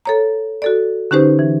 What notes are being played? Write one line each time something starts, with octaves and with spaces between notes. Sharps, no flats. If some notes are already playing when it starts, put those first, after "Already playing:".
A4 C#5 A#5
F#4 A4 D5
D3 C#4 D#4 G4 B4 C5
E3